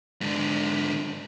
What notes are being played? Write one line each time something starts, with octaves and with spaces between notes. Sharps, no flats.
G#2 D3